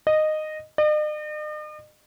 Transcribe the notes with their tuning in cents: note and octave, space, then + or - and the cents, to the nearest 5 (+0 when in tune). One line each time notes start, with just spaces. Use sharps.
D#5 -10
D#5 -45